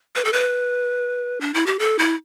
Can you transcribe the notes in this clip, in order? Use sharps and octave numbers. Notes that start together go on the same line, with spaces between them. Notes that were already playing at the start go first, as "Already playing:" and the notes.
B4
A4
B4
D4
E4
G4
A4
E4